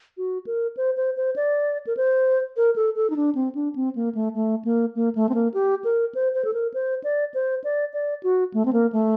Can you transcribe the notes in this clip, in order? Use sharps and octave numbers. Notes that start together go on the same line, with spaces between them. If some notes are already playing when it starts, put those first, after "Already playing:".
F#4
A#4
C5
C5
C5
D5
A#4
C5
A#4
A4
A4
D#4
D4
C4
D4
C4
A#3
A3
A3
A#3
A#3
A3
C4
A#3
G4
A#4
C5
C5
A4
A#4
C5
D5
C5
D5
D5
F#4
A3
C4
A#3
A3